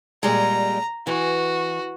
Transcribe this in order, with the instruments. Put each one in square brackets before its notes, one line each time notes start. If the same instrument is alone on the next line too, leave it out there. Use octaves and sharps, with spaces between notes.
[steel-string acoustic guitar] A#2 G3 G#3 [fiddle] A#5
[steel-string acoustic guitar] E3 [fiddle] F#4